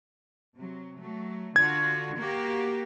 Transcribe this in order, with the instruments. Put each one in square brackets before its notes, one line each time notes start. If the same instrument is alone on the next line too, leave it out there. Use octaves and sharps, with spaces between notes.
[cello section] C3 F#3
F#3 A3
[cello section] D3 F4 F#4 [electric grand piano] G#6
[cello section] A#3 F#4 G4